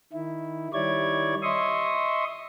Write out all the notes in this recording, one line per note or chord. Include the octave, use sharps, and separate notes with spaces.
D#3 E4
D#3 G3 E4 C#5 D5 G#6
D#5 E5 C6 C#6 D#6